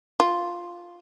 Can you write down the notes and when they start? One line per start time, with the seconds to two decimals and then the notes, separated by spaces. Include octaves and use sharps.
0.20 F4